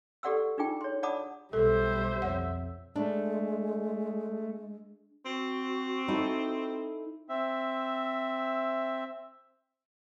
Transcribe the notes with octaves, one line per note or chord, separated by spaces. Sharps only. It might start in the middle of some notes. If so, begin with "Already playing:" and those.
G4 A4 D5 F#5 C6 E6
D4 D#4 F4 G#4 G5
C#5 C6
D5 F#5 A5 B5 D6 D#6
B1 G3 A4 C5 E5
F2 C#5 F#5
G#3 A3 D4
C4 F#4
D#4 E4 A4
C4 E5